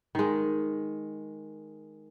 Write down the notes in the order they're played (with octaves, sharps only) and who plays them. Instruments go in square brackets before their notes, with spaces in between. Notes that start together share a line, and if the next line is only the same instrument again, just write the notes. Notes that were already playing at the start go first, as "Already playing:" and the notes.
[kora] D#3 G#3